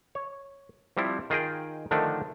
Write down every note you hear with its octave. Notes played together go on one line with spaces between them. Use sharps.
C#5
F3 G3 C4 E4
D#3 F4 G#4 D#5 G5
D3 D#3 F3 A3 D4